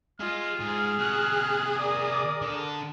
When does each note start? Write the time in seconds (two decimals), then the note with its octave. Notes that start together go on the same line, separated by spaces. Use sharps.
0.20 F4 G#4 D#5 F6
0.60 G#2 G#4
0.99 C3 F#4 F#6
1.76 A#4 D5 D#6
2.42 D3 A4